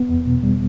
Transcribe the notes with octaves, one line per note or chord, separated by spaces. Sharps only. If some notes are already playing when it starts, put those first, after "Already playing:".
Already playing: B3
E2
B2
G3